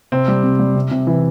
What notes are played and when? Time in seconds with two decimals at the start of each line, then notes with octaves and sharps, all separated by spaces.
0.12 C3 C4
0.28 G3
0.44 C3
0.59 G3
0.76 C3
0.91 C3
1.07 E3